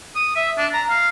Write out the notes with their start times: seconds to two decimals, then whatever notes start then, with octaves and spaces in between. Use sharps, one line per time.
0.15 D#6
0.36 E5
0.58 D4
0.73 A#5
0.89 F5